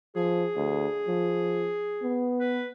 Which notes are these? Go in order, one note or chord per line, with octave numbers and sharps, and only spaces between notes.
F3 G#4
D2
F3
B3
B4